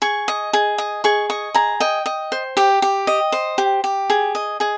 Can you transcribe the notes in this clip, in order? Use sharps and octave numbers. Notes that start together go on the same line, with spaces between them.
G#4 C#6
D#5
G#4
D#5
G#4 C#6
D#5 C#6
G#4 A#5
D#5 G5
D#5
C5
G4 G5
G4
D#5
C5
G4
G4
G#4
D#5
G#4 D#5